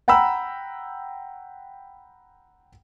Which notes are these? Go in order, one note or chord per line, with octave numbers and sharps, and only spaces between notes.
F#5 G5 A#5 B5 E6